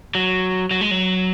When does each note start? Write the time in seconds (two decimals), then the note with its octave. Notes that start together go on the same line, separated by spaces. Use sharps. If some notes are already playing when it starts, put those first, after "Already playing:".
0.15 F#3
0.71 F#3
0.81 G#3
0.91 F#3